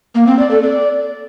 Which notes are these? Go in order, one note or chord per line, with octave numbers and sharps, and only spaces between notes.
A#3
C4
D5
A4
D5